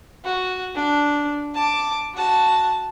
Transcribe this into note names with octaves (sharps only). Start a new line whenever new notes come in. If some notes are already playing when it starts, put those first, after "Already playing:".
F#4
D4
A5 D6
F#4 A5